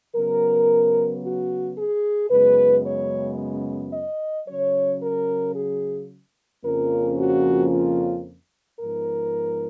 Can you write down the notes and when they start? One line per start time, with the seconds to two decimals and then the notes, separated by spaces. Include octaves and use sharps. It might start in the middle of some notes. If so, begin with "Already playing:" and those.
0.15 C#3 F#3 B3 A#4
1.23 F#4
1.77 G#4
2.30 F#2 C#3 G#3 B3 B4
2.86 C#5
3.93 D#5
4.47 C#3 F#3 C#4 C#5
5.02 A#4
5.56 G#4
6.64 F2 C#3 F3 A#3 C#4 A#4
7.18 F#4
7.72 F4
8.80 G#2 F3 B3 A#4